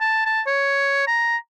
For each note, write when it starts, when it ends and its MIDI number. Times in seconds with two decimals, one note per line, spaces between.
0.01 0.22 81
0.25 0.41 81
0.46 1.05 73
1.07 1.36 82